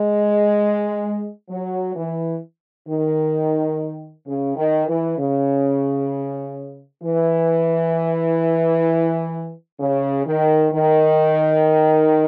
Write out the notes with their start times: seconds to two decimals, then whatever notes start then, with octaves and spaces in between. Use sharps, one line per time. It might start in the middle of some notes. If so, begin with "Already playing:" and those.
Already playing: G#3
1.50 F#3
1.96 E3
2.88 D#3
4.27 C#3
4.56 D#3
4.88 E3
5.19 C#3
7.03 E3
9.80 C#3
10.26 D#3
10.73 D#3